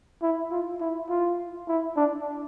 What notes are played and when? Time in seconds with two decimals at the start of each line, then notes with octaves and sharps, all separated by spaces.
0.22 E4
0.51 F4
0.80 E4
1.09 F4
1.68 E4
1.96 D4